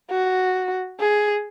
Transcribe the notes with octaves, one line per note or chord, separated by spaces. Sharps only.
F#4
G#4